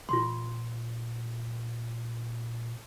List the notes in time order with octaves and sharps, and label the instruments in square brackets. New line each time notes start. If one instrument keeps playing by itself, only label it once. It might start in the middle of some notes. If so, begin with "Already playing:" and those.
[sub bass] A#2 [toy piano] F4 C6